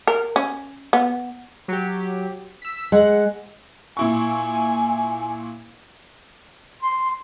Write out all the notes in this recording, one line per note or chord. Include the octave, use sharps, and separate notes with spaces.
A#4
C#4
B3
F#3 G4
E6 B6
G#3 F#5
A#2 E4 G#5 C#6
C6